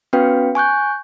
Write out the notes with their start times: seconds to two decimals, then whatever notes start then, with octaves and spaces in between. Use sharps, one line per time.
0.13 B3 C#4 F#4 B4 F5 G5
0.55 G#5 C#6 F#6 G6